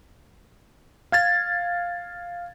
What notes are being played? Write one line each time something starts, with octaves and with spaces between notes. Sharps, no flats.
F5 G#6 A6